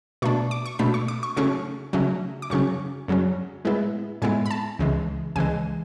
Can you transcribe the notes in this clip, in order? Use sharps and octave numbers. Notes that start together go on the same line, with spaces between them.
B2 A3 D4 C#6
D6
C#6
B2 A3 D4 B5
C#6
D6
C#6
C#3 F#3 A3 C#4 C#6
C#3 F#3 A3 C#4
D6
F#2 C#3 F#3 C#4 C#6
F#2 C#3 F#3 C#4
A2 G#3 B3 E4
A2 G#3 B3 E4 G#5
B5
A5
C#2 C#3 E3 G#3
C#2 C#3 E3 G#3 G#5